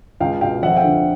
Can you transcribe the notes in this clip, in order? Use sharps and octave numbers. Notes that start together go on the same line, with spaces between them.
C#2 F5 G5
B2 F5 G5
F2 E5 F#5
F5 G5
D3